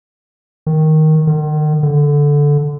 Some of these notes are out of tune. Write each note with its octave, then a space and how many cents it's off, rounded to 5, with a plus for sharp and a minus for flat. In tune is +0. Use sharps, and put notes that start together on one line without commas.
D#3 +5
D#3 -40
D3 -10